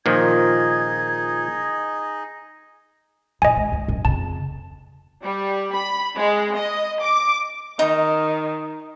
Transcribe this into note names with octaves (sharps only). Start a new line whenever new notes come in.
A#2 D#3 F3 D#4 G#4 D#5 G#6
A#1 E2 D#5 G#5
G#3
D#2 A3
F#2
F2 C#3 A5
G3
B5
G#3
D#5
D6
D#3 D#4